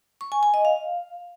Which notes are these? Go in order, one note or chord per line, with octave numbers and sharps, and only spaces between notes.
C#6
G#5
G#5
D#5
F5